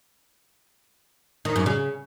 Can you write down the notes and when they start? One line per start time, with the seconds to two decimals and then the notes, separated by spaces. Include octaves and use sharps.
1.45 D#3
1.56 F#2
1.66 C#3